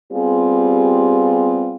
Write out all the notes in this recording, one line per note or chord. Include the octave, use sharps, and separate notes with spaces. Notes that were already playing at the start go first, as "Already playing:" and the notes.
G3 B3 C4 F4 G4 G#4